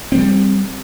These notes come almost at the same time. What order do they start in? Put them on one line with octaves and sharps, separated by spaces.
C4 G#3 G3